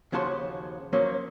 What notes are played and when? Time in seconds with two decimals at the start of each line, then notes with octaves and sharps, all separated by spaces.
0.12 D#2 C#3 F3 F#4 A5 C6
0.93 F3 F#3 A#3 C#4